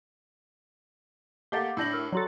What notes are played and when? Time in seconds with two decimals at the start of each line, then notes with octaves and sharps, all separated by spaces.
1.52 A3 A#3 G4 A4 F5 F#5 A6
1.77 A2 D4 E6 G6 A#6 F#7
1.93 A#4 E6 F6
2.13 F#3 F#4 A4 D5 A#5 C6